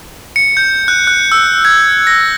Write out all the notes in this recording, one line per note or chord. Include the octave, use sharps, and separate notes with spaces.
C#7
G6
F#6
F#6
E6
G#6
A#6